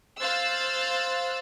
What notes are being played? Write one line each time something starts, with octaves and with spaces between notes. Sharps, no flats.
C5 F5 E6 F#6 A6